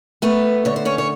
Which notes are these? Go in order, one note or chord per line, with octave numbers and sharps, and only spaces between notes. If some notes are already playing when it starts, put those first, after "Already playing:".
A3 B3 B4
D3 C#5
C5
C#4 C#5
C#5